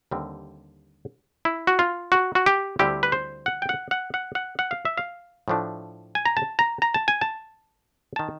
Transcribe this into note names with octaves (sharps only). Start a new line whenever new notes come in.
D#2 D3 G3 C4
E4
F#4
F4
F#4
F#4
G4
D2 D3 G3 C4 E4 G4
B4
C5
F#5
G5
F#5
F#5
F#5
F#5
F#5
F5
E5
F5
A2 F3 A3 D4
G#5
A#5
A5
A#5
A#5
A5
G#5
A5
D#3 A5